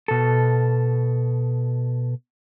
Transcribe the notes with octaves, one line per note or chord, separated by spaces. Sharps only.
B2 A4